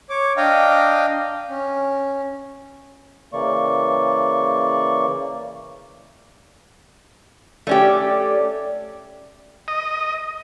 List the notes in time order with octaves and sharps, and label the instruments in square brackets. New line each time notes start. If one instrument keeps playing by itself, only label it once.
[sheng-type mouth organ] C#5 D6
D4 D#5 F5 G5 A#5
C#4
[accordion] C#3 E3 A#3 D5 C#6
[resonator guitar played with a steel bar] A3 C#4 G4 [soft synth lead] D5
[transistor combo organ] D#5